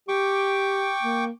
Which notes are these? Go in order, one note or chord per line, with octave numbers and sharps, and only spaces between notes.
G4 G5 C#6 D6
A#3